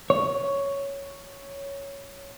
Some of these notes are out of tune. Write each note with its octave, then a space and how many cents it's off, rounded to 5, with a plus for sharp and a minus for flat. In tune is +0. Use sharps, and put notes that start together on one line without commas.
C#5 +5